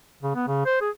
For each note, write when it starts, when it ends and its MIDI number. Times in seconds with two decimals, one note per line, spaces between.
0.23 0.35 49
0.36 0.46 59
0.47 0.61 49
0.65 0.78 72
0.81 0.90 68